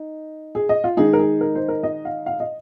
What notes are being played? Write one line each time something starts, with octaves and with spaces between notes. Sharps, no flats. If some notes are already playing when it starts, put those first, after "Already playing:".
Already playing: D#4
G#4
D#5
F4
D#3 G#3 D#4 G#4
A#4
G#4
A#4
C5
A#4
D#5
F5
F5
D#5